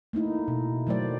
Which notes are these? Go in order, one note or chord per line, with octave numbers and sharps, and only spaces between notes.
A3 A#3 D#4 E4
B2
D#3 F#3 A3 C5 D5